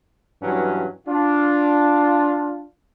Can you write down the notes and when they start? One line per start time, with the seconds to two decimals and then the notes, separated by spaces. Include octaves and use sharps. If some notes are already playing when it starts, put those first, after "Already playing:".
0.42 G2 E3 F#3 C#4
1.07 D4 F4